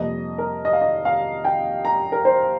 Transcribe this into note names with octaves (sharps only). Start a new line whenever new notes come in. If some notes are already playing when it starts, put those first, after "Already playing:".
Already playing: F2 C3 G3 A#3 D#5
A#4
D#5
F5
D#5
F5
G5
A#5
A#4
C5